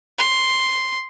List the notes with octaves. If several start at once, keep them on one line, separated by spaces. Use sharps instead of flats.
C6